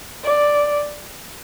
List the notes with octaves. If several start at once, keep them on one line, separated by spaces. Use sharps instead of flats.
D5